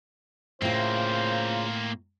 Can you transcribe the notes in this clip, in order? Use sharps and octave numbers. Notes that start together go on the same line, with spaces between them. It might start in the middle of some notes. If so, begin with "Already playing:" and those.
A2 C#3 A#3 C4 F4 A#4 C5